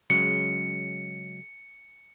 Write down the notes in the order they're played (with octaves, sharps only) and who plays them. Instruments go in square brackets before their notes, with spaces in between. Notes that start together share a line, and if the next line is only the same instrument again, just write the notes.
[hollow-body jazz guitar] C#3 F#3 G#3 [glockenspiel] C#7